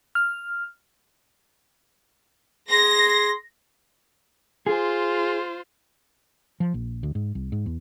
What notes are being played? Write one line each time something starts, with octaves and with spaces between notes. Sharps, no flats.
F6
G#4 C6 A#6
F4 G#4 C5
F3
A#1
D2
G#2
C2
G#2
E2